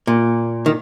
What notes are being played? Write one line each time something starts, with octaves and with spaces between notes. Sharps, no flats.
A#2
D#3